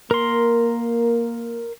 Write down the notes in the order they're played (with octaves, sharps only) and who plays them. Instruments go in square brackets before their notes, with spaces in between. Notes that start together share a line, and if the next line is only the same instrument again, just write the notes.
[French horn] A#3 [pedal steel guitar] A#4 C6